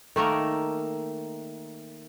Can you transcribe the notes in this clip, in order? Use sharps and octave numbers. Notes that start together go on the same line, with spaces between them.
D#3 A3 A#3 A#4